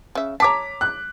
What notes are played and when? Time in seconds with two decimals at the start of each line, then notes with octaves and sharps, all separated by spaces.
0.15 C#3 E5
0.40 C#5 A5 A#5 D6 B6
0.81 F#6